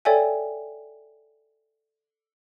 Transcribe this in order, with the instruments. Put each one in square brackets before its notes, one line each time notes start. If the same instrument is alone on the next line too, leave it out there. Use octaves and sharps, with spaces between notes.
[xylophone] A4 C#5 D5 E5 G5 G#5